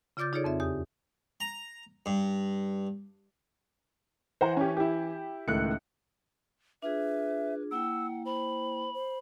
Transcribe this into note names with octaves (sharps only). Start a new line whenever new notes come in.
C#3 F4 D5 D6 G6 A6
D#4 F4 G#4 A4 C#5 D5
F2 C4 E5
E2 G4 D#6
A#5
G2
E3 C5 F#5 A#5
C#4 G4
E4 G4
C#2 A2 D#3 F#6 C#7
D4 F4 G#4 B4 E5
A#3 E4 F#5 G5 E6
C5 B5
C5